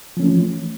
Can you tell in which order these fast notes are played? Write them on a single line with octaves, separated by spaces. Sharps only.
F3 C#4 A3 E3